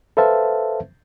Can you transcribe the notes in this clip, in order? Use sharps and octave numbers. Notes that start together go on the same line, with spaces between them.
A4 B4 C5 E5 F5 A5